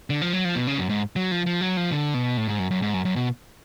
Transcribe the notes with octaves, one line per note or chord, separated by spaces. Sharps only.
D3
F3
F#3
F3
B2
C#3
F#2
G#2
F#3
F3
F3
F#3
F3
D3
B2
A2
G#2
F#2
F#2
G#2
F#2
F#2
B2